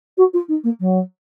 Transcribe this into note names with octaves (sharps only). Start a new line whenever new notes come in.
F#4
F4
D#4
A#3
F#3